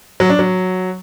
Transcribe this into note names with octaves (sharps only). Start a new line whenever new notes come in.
F#3
D4
F#3